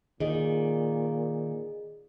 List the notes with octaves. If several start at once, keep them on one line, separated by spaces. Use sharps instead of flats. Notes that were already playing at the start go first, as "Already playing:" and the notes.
A#2 D#3 G#4 D#5